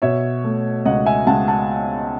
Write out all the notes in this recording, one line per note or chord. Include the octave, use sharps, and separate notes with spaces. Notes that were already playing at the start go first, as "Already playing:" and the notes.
B2 C#5 E5
A3
C#2 D#5 F#5
E5 G#5
C#2 F#5 A5
F#5 A5